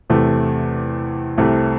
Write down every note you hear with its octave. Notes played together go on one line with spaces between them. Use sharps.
E2 C3 A3
C2 C3 A3